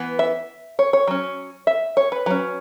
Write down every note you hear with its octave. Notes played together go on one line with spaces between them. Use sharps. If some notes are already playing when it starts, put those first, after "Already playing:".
Already playing: E3 B3
E5
C#5
C#5
F#3 C#4
E5
C#5
B4
F#3 C#4